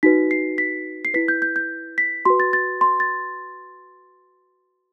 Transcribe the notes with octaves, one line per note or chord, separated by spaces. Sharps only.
D#4 F#4 B4 B6
C7
B6
C7
E4 B4 B6
G6
G6
G6
B6
F#4 B4 C6
A6
A6
C6
A6